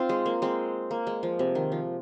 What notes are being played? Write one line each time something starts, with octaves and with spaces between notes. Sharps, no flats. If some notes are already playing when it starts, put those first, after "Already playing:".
Already playing: C4 D#4 F4
G#3
A#3
G#3 C4
A#3
G#3
F3
C3
D#3
F3